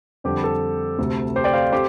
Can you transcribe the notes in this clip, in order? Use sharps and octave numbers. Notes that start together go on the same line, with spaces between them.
F2 D3 G3 C4 G4
A4
D2 C3 A3 C4
G4 C5
D5 G5
C5 F5
A3 C4 G4 C5